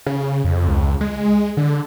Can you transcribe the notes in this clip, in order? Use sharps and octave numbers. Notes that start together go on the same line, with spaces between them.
C#3
F2
C#2
G#3
D3